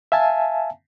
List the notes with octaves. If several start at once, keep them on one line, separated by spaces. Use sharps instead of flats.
E5 F5 G#5 A5